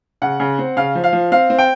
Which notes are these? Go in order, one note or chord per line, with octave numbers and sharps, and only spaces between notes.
C#3 F#5
C#3
C4
C#3 F5
F3
F5
F3
C4 F5
C4
G5